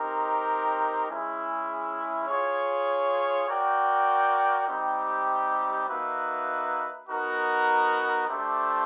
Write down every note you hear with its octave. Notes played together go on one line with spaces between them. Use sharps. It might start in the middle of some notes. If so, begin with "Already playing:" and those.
Already playing: C4 D#4 G4 A#4
G#3 C#4 E4 G#4
F4 G#4 C#5
F#4 A#4 D5 G5
G3 C4 D#4 G4
A#3 D#4 F#4 B4 E5
B3 D#4 F#4 A#4
A3 D4 G4 C5 E5